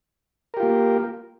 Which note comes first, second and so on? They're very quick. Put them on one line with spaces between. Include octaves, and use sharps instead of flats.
A#4 G4 F4 A#3